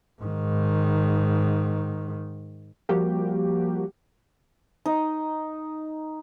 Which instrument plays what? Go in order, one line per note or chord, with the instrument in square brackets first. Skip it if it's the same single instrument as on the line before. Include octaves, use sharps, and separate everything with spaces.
[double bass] G#2 D#3
[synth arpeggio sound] F3 G3 A#3 F#4 G4
[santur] D#4